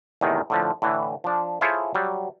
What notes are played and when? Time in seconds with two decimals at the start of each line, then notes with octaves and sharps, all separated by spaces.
0.21 E2 A2 C3 D#3
0.50 A2 D3 F3
0.82 A2 D3 E3
1.24 F3 D4
1.61 E4 F4 G#4 A4 C5 C#5
1.95 F#3 G3